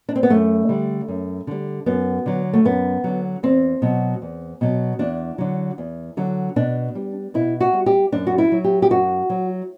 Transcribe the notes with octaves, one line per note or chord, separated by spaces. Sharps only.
D4
C4
B3
F#2 A3
D3 G3
F#2
D3 G3
F#2 B3
D3 F#3
A3
F#2 B3
D3 F#3
E2 C4
B2 F#3
E2
B2 F#3
E2 D4
D3 F#3
E2
D3 F#3
B2 D4
G3
B2 E4
F#4
G3
G4
F#2 D4
F#4
E4
F#3
G4
G4
F#2 F#4
F#3